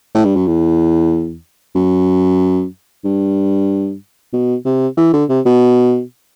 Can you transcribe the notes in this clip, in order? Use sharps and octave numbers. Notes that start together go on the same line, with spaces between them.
A2
G2
F#2
E2
F#2
G2
B2
C3
E3
D3
C3
B2